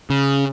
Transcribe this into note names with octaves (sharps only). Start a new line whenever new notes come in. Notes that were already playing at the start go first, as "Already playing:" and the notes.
C#3